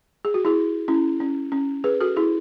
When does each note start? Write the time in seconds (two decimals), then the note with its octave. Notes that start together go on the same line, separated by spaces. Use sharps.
0.25 G#4
0.34 F#4
0.45 E4 G#4
0.88 C#4 E4
1.20 C#4
1.52 C#4
1.84 G#4 B4
2.01 F#4 A4
2.17 E4 G#4